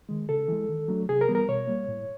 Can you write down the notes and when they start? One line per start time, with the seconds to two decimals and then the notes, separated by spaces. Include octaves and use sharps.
0.09 D#3 G#3
0.29 C#3 A4
0.48 E3 G#3
0.69 D#3
0.88 F#3 A3 D4
1.09 C3 G#4
1.21 A#4
1.28 E3 G3 B3
1.35 A#4
1.49 B2 C#5
1.68 G3 A#3
1.88 A2